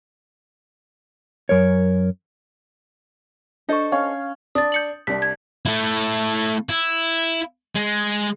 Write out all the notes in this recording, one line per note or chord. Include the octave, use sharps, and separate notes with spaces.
F#2 A#4 C#5
D4 A4 C5 D#5 C#6
C#4 F5
D4 D#6 A6
G6 C#7 F#7
C2 D4 B6
G#6
A3 E4
E4
G#3